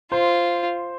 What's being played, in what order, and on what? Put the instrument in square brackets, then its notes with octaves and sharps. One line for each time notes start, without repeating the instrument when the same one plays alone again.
[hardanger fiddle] F4 [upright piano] C5